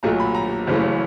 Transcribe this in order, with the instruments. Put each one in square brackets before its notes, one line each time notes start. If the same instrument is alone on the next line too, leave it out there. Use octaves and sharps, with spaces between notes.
[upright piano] B1 A#2 F#3 A3 A#5
B5
A#5
F#1 F#2 C#3 E3 A3